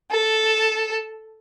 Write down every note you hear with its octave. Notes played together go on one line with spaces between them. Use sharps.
A4